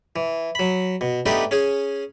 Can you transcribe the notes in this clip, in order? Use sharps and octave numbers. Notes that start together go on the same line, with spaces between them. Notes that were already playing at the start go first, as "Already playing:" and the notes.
E3
F#3 B5
B2
A3 B3 D4 D#4 G4 B4
C#4 G#4